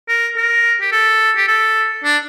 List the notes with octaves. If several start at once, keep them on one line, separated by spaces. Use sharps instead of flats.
A#4
A#4
G4
A4
G4
A4
D4